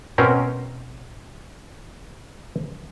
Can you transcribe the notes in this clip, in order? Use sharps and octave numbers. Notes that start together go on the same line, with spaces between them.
B2 C4 C#4 A#4 C5